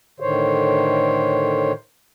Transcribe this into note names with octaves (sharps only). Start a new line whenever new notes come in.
A2 D3 D#3 C5 C#5